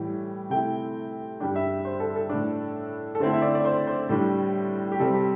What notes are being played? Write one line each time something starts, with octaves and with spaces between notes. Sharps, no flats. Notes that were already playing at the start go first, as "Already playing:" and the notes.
Already playing: A2 E3 G3 E4
C3 A3 E4 G5
G2 G3 D4 G5
E5
C5
A4
A4
A2 A3 D4
A4
D3 A3 C4 E4 C5
E5
D5
D5
C5
C5
A2 G3 D4
G4
C3 G3 C4 A4
G4